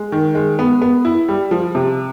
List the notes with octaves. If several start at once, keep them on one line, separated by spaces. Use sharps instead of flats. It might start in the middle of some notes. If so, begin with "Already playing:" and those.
Already playing: G#3
D#3
G#3
B3
B3
E4
G3
F3
C3